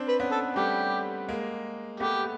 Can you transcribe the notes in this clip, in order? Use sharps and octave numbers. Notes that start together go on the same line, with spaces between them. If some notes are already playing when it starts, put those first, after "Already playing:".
Already playing: C4 D4
B4
B3 C#4
A4
G3 A3 G4
G#3 A#3
A3 B3 G4